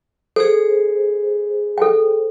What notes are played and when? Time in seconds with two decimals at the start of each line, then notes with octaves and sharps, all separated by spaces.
0.36 G#4 A4 C5
1.78 A4 G5